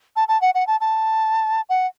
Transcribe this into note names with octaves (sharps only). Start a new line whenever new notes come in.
A5
A5
F#5
F#5
A5
A5
F#5